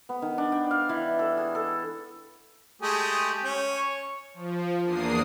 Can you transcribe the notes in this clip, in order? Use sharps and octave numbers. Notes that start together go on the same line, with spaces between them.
B3
D#3
D4
G5
F5
E3
A4
G#4
A4
G#3 A3 G4 G#4
C#4
C#5
F3
E2 A#3 D4 D#6 C7